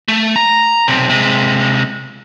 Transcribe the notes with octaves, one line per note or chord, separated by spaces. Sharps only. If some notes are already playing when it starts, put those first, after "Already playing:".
A3
A#5
B1 C3
C3 G#3